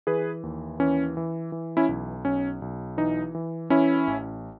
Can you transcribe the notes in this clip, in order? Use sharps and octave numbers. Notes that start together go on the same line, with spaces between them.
E3 G#4 B4
D#2
E3 C#4
E3
E3
C#4 E4
B1
B1 C#4
B1
E3 D#4
E3
E3 C#4 E4
A1